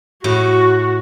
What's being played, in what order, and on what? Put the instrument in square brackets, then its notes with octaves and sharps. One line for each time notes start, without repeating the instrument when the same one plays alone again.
[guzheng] A2 [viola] F#4